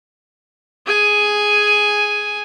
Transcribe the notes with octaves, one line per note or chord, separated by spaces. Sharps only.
G#4 G#5